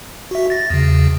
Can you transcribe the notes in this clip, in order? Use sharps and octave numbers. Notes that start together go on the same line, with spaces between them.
F#4 E5
A6 A#6
E2 C#3